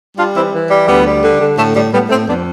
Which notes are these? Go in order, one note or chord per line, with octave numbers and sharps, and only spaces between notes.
G3 D4 F4
E3 C4 E4
E3
G3
D2 G3 B3
G3
D3
D3
A2 A3
A2 G3
A2 G3 B3
A2 A3 C4
F2 B3 D4